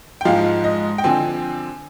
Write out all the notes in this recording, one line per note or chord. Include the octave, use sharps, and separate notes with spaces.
G5
G#2 F3 G#3 F5
D#5
G5
D3 F3 C4 G#5